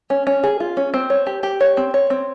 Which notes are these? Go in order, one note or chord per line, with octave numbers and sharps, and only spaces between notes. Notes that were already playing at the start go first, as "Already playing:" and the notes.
C#4
C#4
G#4
F4
C#4
C4
C#5
G4
G4
C#5
C4
C#5
C4